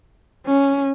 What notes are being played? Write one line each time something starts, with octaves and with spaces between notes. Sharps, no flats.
C#4